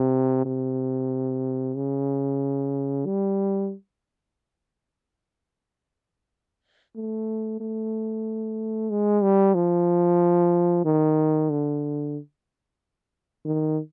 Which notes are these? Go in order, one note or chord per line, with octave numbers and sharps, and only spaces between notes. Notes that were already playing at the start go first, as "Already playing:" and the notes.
Already playing: C3
C3
C#3
G3
A3
A3
G#3
G3
F3
D#3
D3
D#3